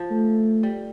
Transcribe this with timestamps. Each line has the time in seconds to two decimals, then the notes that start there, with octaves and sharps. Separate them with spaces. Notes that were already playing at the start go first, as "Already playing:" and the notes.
Already playing: F3
0.11 A3
0.63 G3